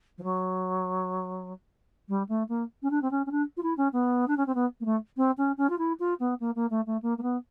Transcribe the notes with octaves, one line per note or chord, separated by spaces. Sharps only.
F3
F#3
G3
A3
A#3
C#4
D4
C4
C#4
C#4
D4
F4
E4
C#4
B3
D4
C#4
C4
B3
A#3
A3
C4
C#4
C#4
F4
E4
F4
B3
A#3
A#3
A3
A3
A#3
A#3
B3